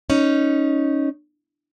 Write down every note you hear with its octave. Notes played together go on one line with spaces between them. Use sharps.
C#4 D#4